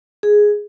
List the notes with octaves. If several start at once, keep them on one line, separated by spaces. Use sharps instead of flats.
G#4